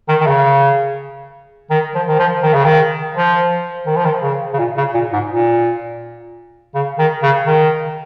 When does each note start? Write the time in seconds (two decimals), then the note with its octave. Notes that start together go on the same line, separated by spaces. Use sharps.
0.09 D#3
0.21 D#3
0.26 C#3
1.70 D#3
1.95 F3
2.07 D#3
2.19 F3
2.43 D#3
2.54 C#3
2.64 D#3
3.15 F3
3.86 D#3
3.96 F3
4.05 D#3
4.22 C#3
4.53 C#3
4.59 A#2
4.77 C#3
4.94 A#2
5.13 G#2
5.30 A#2
6.75 C#3
6.98 D#3
7.23 C#3
7.46 D#3